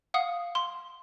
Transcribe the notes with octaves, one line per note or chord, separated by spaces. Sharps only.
F5 F#5 D#6
C6